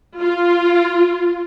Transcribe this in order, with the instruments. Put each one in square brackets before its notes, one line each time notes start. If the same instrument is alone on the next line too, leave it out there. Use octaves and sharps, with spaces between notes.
[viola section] F4